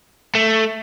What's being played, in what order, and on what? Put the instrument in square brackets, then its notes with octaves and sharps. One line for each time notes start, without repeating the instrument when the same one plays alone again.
[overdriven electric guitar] A3